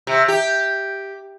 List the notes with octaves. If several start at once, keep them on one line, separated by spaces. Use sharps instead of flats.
C3
G4